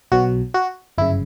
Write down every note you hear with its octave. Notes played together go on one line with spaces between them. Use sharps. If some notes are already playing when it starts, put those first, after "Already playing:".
B1 B2 F#3 F#4
F#4
G1 F#2 C#3 E4